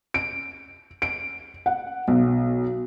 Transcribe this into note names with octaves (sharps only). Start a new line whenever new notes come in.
D7
D7
F#5
B1